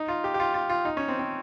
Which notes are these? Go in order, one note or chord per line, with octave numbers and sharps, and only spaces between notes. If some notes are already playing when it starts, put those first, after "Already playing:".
Already playing: D#4
F4
G4
G4
F4
F4
F4
D#4
C#4
C4
C4